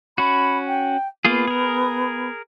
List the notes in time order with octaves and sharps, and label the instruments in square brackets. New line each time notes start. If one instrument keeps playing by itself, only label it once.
[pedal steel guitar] C#4 F#4 [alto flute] B5
[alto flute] G5
[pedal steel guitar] A#3 F4 G#4 [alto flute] B3
[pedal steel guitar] G#4 A#4